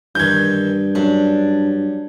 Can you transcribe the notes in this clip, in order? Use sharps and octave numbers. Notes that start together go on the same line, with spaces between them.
G2 D#3 E3 G6 G#6
F#2 D4